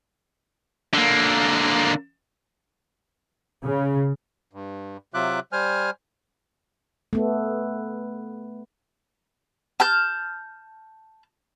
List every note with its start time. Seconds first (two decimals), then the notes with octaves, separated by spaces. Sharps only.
0.94 D3 A#3
3.65 C#3
4.53 G2
5.14 C3 F#3 F4 E5 D6 F#6
5.52 G3 C5 G#5 F6
7.13 A3 B3
9.80 A5 F6 G6